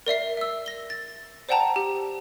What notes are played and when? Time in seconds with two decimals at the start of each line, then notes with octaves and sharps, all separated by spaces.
0.06 A#4 D5 E5 C7
0.37 E5 E6
0.66 A#6 G7
0.90 A6
1.49 C5 D5 F#5 G5 A5 A#5
1.76 G4